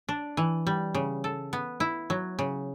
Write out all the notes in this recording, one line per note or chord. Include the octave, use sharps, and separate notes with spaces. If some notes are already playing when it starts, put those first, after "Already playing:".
D4
E3
G3
C#3
A4
B3
E4
F#3
C#3